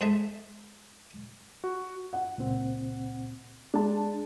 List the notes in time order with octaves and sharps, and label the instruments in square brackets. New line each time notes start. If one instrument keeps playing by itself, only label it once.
[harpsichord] G#2 G#3 G#4 A4 E5
[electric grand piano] F#4
[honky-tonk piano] F#5
[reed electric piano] C#2 A#2 C4
[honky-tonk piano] G#3 A5 [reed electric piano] D4